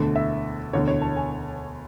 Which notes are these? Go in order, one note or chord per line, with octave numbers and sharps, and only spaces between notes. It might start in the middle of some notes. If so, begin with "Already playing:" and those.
Already playing: E1 D2 D3 A3
E5
E1 D2 D3 C#5
C#5
A5
G#5